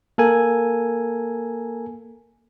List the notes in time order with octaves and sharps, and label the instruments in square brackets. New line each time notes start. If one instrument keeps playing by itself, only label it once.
[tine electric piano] A#3 A4 A#4 G#5